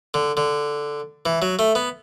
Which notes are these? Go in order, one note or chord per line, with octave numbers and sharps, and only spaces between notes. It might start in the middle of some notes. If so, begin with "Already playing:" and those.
D3
D3
E3
F#3
A3
B3